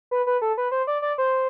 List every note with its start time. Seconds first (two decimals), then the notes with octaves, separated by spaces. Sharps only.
0.11 B4
0.27 B4
0.42 A4
0.58 B4
0.72 C5
0.87 D5
1.02 D5
1.18 C5